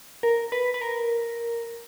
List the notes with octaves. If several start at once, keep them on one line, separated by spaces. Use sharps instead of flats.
A#4
B4
B4
A#4